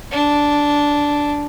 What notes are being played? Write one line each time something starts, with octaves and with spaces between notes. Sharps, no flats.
D4